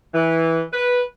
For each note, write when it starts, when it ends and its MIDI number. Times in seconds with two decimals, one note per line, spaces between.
0.14 0.61 52
0.73 1.00 71